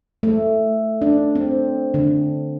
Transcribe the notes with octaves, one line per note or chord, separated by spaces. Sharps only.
A3
D4
C4
D3